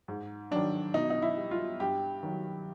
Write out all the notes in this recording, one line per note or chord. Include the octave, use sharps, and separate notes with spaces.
G#2
D#3 F#3 D4
B2 D#4
D#4
E4
G3
F4
G2 G4
D#3 F#3